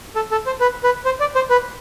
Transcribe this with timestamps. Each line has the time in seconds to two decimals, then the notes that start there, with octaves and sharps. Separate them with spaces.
0.16 A4
0.32 A4
0.46 C5
0.60 B4
0.84 B4
1.05 C5
1.20 D5
1.35 C5
1.50 B4